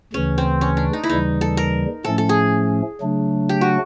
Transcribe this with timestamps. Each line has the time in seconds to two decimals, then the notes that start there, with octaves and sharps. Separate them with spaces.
0.13 D2 C#3 E3 C#4
0.38 C4
0.61 C#4
0.77 D4
0.93 D#4
1.04 E4
1.09 D#2 C#3 E3 G3 D#4
1.41 A4
1.57 A#4
2.04 A2 F3 A3 C#4 A4
2.18 A4
2.29 G#4
3.01 C#3 F#3 A3 D4
3.49 G4
3.61 F#4